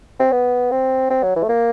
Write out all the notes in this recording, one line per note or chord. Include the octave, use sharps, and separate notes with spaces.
C4
B3
C4
C4
F#3
E3
A3
A#3